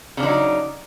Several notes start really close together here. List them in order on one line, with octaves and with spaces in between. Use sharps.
C#3 D4 F3 D#4 F#3